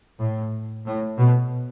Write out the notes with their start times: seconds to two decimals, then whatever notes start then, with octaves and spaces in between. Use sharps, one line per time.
0.20 A2
0.86 A2
1.18 B2